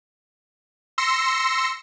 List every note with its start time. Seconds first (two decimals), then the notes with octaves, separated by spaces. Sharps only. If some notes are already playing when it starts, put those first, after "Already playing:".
0.98 C6 E6 A#6 C#7